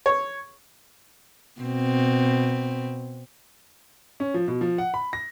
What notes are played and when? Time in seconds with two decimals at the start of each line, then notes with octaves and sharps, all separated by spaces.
0.06 C#5
1.61 B2 C4
4.20 C#4
4.34 F3
4.48 B2
4.61 F3
4.78 F#5
4.94 B5
5.13 A#6